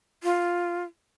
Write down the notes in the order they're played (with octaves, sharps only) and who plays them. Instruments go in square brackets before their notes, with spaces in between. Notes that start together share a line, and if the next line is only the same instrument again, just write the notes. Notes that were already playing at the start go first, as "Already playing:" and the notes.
[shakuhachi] F4